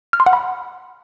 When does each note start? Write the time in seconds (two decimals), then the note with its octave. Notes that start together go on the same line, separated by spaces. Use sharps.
0.13 F6
0.20 C6
0.26 F#5
0.33 B5